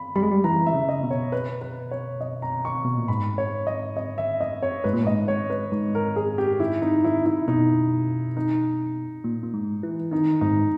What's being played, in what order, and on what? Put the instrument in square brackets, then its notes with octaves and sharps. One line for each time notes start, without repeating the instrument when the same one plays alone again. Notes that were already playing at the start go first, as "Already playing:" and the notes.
Already playing: [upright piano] B5
[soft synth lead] G3 [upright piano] B5
[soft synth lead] G#3
G3
[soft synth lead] E3 [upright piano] A#5
[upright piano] E5
[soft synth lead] C#3
[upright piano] D#5
[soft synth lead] B2
[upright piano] C#5
B4
B4
C#5
D#5
A#5
C#6
[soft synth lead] B2
A#2
[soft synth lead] G#2 [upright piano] B5
[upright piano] C#5
D#5
D#5
E5
D#5
C#5
[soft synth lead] G#2 [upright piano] B4
[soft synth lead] A#2
[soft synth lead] G#2 [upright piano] D#5
[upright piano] C#5
B4
[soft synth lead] G#2
[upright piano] A#4
G#4
G4
E4
D#4
E4
E4
[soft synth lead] B2 [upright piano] D#4
[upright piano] D#4
[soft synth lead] A#2
A#2
G#2
E3
[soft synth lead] D#3 [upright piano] D#4
[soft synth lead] G#2 [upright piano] D#4